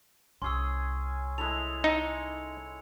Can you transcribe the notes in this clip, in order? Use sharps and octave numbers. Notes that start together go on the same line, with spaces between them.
C2 C#4 G#4 C6 E6
G#3 E4 A4 F7
D#4 C#7